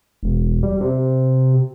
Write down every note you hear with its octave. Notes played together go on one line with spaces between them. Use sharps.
E1
G3
C3